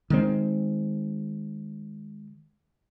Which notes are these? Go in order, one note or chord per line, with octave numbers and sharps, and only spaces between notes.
D#3 G#3 C4